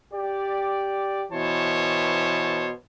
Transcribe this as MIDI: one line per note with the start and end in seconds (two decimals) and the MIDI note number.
0.13 1.24 67
0.13 1.24 74
1.32 2.70 47
1.32 2.70 52
1.32 2.70 72
1.32 2.70 73
1.32 2.70 81